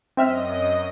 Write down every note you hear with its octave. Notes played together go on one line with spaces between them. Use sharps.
F#2 C4 D#5 E5 F6